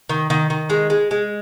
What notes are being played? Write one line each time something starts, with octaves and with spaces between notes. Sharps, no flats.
D#3
D#3
D#3
G#3
G#3
G#3